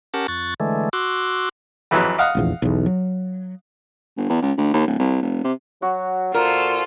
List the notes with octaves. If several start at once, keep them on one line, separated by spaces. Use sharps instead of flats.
C#4 G4 A#4 F#5 A5
F2 C#6 F#6 A6
D3 E3 G#3 A3
F#4 C6 D6 E6 F#6
F2 E3 F#3
D#5 F5 F#5
F1 A#1 E2
B1 E2
F#3
G1
E2
C#2
D2
D#2
D1
C2
F1
C3
F#3 F#4
A#2 F4 A4 A#4 C5